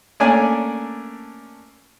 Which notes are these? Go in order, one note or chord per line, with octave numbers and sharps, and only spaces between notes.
A3 A#3 C#4 D4 D5 G#5